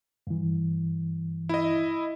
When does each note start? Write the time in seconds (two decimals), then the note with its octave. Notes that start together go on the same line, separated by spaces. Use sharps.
0.27 G2 E3
1.49 E4 D#5